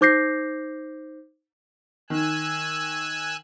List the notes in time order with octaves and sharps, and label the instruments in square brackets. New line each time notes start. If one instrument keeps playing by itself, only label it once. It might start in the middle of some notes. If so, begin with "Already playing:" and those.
[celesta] D#4 C5 D6 G6 A#6 C7
[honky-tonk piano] D#3 [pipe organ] G#5 E6 F#6